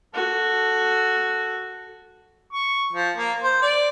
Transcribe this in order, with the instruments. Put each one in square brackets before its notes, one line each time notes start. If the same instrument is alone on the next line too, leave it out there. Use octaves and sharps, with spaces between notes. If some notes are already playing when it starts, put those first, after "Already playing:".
[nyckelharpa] F#4 A4
[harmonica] C#6
F3
A#3
C5
D5